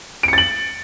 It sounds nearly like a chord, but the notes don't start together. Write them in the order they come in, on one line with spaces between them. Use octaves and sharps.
D7 C#7 A6 F#7